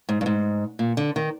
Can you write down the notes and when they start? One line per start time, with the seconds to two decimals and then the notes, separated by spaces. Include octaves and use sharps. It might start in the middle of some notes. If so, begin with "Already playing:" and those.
0.09 G#2
0.21 G2
0.26 G#2
0.79 A#2
0.97 D3
1.16 D#3